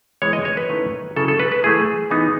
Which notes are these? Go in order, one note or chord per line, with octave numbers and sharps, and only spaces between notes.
E3 G#3 B3 C#5
D#5
C#5
B4
D#3 A3 C#4 E4
C#3 F#3 C#4 E4 A4
A4
B4
B4
E3 A3 E4 G#4
E3 B3 D#4